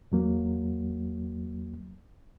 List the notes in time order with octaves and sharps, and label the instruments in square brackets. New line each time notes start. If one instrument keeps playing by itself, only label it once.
[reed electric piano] E2 F#3 A#3